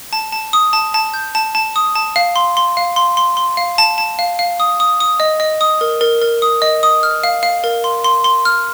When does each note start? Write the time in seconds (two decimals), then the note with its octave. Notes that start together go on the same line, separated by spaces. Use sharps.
0.13 A5
0.32 A5
0.53 D#6
0.73 A5
0.94 A5
1.14 G6
1.35 A5
1.55 A5
1.76 D#6
1.95 A5
2.16 F5
2.36 C6
2.57 C6
2.77 F5
2.96 C6
3.17 C6
3.37 C6
3.57 F5
3.78 A5
3.98 A5
4.19 F5
4.39 F5
4.60 D#6
4.80 D#6
5.00 D#6
5.20 D#5
5.40 D#5
5.61 D#6
5.81 A#4
6.01 A#4
6.22 A#4
6.42 D#6
6.62 D#5
6.83 D#6
7.03 F6
7.24 F5
7.43 F5
7.64 A#4
7.84 C6
8.04 C6
8.24 C6
8.45 F6